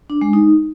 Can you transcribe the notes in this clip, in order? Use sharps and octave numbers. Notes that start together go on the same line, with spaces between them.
D4
G#3
D#4